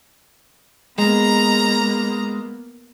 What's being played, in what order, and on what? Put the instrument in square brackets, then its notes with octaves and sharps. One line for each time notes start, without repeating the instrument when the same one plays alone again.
[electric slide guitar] G#3 [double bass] A#3 B3 [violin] A#5